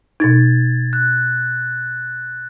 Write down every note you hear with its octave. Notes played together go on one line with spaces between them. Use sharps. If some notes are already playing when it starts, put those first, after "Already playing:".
B2 D#4 G#6 A6
F#6